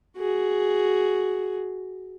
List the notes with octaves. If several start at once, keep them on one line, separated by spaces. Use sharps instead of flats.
F#4 G#4